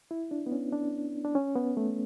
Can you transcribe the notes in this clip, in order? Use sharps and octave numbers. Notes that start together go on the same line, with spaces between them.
E4
D4
B3
C#4
D4
D4
C#4
B3
A3